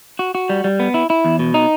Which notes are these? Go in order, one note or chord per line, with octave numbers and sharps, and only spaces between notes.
F#4
F#4
G3
G3
B3
E4
E4
E2
B2
D#4